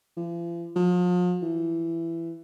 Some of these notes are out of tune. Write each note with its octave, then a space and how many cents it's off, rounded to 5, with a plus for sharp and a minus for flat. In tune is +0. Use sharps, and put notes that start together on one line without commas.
F3 -45
F3 +40
E3 +15